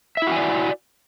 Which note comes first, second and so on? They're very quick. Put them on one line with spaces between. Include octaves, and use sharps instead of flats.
E5 E4 F#4 G#5 D5